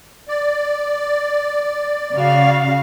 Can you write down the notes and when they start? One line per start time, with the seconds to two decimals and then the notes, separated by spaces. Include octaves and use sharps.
0.28 D5
2.14 C#3 F#4 F5